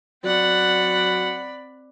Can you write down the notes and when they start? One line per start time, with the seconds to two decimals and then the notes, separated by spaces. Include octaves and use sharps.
0.24 F#3 C4 D5 F#5 B5